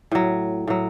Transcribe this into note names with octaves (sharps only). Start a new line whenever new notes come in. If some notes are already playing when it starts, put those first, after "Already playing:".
A2 F#3
A2 F#3